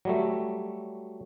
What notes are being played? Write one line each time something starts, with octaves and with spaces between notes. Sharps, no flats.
F#3 G3 A3